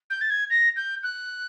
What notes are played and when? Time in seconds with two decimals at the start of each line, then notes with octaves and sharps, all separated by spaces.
0.10 G6
0.21 A6
0.30 G#6
0.50 A#6
0.76 G6
1.03 F#6